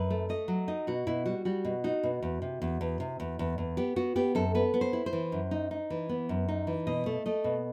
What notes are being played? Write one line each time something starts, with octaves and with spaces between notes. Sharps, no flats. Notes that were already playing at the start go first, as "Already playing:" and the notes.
Already playing: F#2 B4
A3
A3 D#5
F#3
D#4 D#5
B2 F#4
B2 E4
G3 F#4
G3 F#4
B2
D#4 F#4
B2
E2
C3
E2
E2
C3
E2
E2
E2
B3 G4
B3 F#4
B3 G4
F#2 A4
B3 B4
B3
C5
E4
C5
E3
F#2
D#4
D#4
E3
B3
F#2
D#4
E3
B2 D#5
A3
A3 D#5
B2